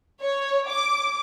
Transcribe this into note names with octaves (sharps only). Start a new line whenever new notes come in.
C#5
D6